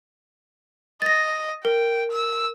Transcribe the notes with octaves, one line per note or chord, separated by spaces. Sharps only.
D#5 A6 A#6
A#4 G5
E6